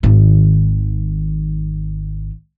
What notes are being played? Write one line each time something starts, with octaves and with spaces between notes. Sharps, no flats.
G#1 D#3